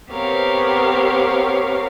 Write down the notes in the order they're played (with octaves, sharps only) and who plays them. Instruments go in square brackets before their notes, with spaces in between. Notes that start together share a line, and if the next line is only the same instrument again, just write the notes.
[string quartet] B3 C4 G4 A#4 C#5 F5